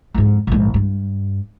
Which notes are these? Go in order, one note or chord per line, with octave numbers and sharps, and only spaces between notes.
F2 G#2
A#1 G#2
G2